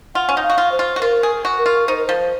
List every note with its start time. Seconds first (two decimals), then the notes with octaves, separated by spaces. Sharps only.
0.15 F4 F#5
0.29 C#4
0.37 D#4
0.43 F5
0.50 F#4
0.58 F4
0.72 C5
0.79 F4
0.96 F#4
1.01 F4 A#4
1.23 G#4
1.45 F#4
1.58 A#4
1.66 F4
1.88 D#4 C5
1.97 A#4
2.07 F3 C5